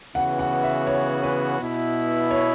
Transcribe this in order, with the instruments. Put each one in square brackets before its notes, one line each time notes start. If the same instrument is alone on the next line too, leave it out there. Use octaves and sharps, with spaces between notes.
[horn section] C#3 E3 B3 F#4 [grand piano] F#5
[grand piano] F#5
E5
C#5
B4
[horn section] B2 B3 E4
[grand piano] C#5